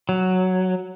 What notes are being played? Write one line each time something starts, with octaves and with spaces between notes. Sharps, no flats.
F#3